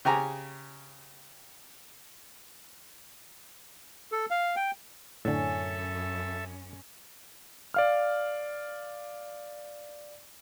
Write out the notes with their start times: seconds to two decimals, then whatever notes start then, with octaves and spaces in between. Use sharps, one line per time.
0.05 C#3 G4 G#5 A#5
4.12 A4
4.30 F5
4.56 G5
5.25 F#2 A2 D3 C#4 A4 C#5 E5 G#5
7.74 D5 F5 F6